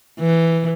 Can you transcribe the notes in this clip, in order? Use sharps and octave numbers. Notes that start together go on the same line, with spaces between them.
E3